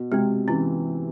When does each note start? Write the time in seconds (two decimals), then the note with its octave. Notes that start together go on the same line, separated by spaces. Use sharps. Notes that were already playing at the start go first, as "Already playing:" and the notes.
Already playing: B2
0.12 C3 G#3 B3
0.48 E3 C#4